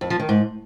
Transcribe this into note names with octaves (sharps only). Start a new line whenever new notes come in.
F2
F3
D#3
G#2